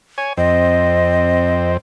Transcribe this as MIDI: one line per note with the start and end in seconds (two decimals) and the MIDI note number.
0.18 0.33 73
0.18 0.33 80
0.37 1.77 41
0.37 1.77 60
0.37 1.73 75